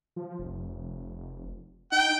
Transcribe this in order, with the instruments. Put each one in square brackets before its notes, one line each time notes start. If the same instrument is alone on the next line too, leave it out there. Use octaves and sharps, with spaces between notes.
[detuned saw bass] F3
F1
[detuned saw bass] D#4 [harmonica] G5